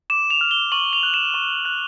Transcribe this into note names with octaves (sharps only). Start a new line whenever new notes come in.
D6 E7
F7
F6
G7
C#6 F#7
F7
F#6
E7
C#6
F#6